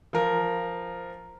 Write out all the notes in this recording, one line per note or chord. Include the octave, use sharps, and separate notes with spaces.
F3 A#4